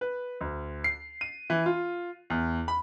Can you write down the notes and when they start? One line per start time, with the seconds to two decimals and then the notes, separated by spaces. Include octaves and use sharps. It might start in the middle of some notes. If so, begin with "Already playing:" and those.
0.01 B4
0.41 D2
0.84 C7
1.21 D#7
1.50 E3
1.66 F4
2.30 E2
2.68 B5